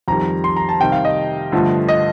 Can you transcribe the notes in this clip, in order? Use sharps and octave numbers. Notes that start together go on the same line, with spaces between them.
F2 D#3 G3 A#5
C6
A#5
A5
C3 D#3 G3 G5
F5
D#5
G2 D3 F3 A3
D#5